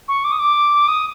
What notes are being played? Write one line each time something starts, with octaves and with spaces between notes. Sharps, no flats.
C#6
D6
D#6
D6
D#6